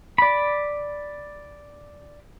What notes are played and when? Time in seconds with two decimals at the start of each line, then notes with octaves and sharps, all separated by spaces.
0.18 D5 B5